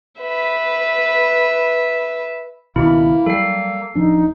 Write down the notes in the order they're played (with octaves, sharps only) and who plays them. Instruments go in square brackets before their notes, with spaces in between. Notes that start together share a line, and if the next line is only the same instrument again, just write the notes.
[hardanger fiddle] B4 E5
[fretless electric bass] C#2 B2 D#3 [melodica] A#3 [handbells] E4 B5
[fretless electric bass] F#3 G3 [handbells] A4 C7
[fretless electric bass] D1 F3 D4 [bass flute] D#4